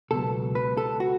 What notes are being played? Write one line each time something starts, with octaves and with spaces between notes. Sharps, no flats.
C#2 B2 F#3 B3 A4
B4
A4
F#4